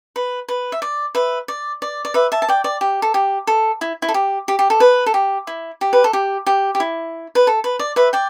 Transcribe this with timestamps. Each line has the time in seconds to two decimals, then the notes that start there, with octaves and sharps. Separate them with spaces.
0.16 B4
0.48 B4
0.72 E5
0.82 D5
1.15 B4 E5
1.48 D5
1.82 D5
2.05 D5
2.14 B4 E5
2.32 E5 A5
2.42 A5
2.49 D5 G5
2.64 D5
2.81 G4
3.02 A4
3.14 G4
3.47 A4
3.81 E4
4.02 E4
4.08 A4
4.14 G4
4.48 G4
4.59 G4
4.70 A4
4.80 B4
5.06 A4
5.14 G4
5.47 E4
5.81 G4
5.93 B4
6.04 A4
6.13 G4
6.46 G4
6.75 G4
6.80 E4
7.35 B4
7.47 A4
7.64 B4
7.79 D5
7.96 B4 E5
8.13 D5 G5